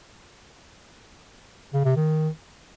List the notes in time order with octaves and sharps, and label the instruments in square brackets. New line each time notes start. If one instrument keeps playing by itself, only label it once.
[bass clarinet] C#3
C3
D#3